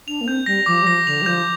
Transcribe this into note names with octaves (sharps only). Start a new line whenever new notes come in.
D4 F7
A#3
C4 G6
G3 A#6
F3 D6
G3
F3 A#6
D3 F7
G3
F3 G6